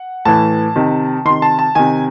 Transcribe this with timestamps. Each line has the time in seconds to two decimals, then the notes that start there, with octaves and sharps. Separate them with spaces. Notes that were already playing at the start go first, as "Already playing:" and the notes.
Already playing: F#5
0.25 A2 E3 A5
0.76 C3 D#3
1.25 C3 D#3 C6
1.42 A5
1.59 A5
1.75 C3 D#3 G#5